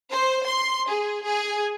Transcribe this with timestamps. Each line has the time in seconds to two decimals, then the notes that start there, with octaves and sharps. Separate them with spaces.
0.13 C5
0.46 C6
0.91 G#4
1.24 G#4